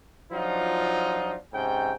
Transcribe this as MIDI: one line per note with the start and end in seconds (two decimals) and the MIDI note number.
0.32 1.34 53
0.32 1.34 54
0.32 1.34 62
0.32 1.34 63
0.32 1.34 65
1.53 1.91 44
1.53 1.91 48
1.53 1.91 61
1.53 1.91 79